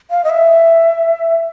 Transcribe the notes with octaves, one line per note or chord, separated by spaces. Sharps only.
F5
D#5
E5